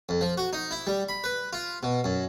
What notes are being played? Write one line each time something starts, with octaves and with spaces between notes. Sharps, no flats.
F2
F3
F#4
D#4
E4
G3
B5
B4
F4
B2
F#2